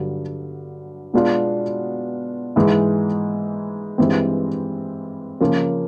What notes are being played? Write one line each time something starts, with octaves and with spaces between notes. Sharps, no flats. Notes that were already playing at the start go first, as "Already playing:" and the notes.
Already playing: G2 D3 F#3
B2 G#3 B3 D4 F4
G#2 E3 G#3
G2 E3 G#3 C4
C#3 F3 A#3 C#4 F4